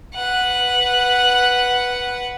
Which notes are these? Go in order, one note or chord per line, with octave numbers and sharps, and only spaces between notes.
B4 F#5